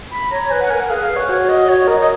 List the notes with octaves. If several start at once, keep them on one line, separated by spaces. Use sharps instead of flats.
B5
C#5 A#5
B4 G#5
F#5
A#4 G#5
F#5
G#4 F5
F5
B4
C#5
F#4 C#5
D#5
F#4 C#5
A#4 D#5
D#5